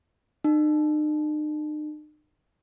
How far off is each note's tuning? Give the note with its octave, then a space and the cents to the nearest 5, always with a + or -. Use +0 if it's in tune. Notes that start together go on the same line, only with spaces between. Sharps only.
D#4 -45